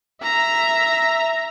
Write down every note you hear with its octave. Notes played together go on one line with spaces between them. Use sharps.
E5 A#5